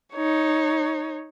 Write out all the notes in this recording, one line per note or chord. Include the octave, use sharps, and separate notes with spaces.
D#4 C#5